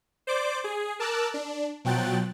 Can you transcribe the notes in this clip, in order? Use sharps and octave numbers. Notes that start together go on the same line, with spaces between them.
C5 D5 D6
G#4
A#4 A5 D6 E6 F#6
D4
B2 F3 F#3 G5 F#6 A6